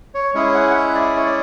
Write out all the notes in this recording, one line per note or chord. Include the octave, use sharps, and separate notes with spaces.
C#5
G#3 C#4 E4 G#4 C#5
F#5
F#5
E5
D5
C#5
D5